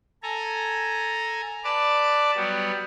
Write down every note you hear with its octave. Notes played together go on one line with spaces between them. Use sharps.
A4 G#5 A#5
B4 D5 A5 D6
F#3 G3 B3